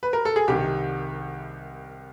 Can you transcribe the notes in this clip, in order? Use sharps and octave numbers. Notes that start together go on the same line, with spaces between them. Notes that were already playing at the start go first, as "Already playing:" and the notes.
B4
A#4
A4
G#4
C2 C3 D#3 G4